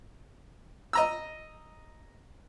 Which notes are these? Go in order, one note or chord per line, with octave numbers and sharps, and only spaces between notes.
D#5 A#5 E6